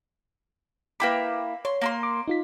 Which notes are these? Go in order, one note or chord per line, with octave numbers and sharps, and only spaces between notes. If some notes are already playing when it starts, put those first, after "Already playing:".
A#3 E4 B4 G5 B5 D6
C#5 C6
A#3 A#5 C6
D6
D#4 F4 B6